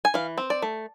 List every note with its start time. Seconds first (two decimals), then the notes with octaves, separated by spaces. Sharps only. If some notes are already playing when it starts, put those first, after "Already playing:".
0.05 G#5
0.14 E3 F5
0.38 C4
0.50 D5
0.62 A3